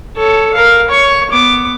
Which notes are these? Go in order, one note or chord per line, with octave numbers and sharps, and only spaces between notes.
A4 C#5
A#4 F5
C#5 C#6
B3 D6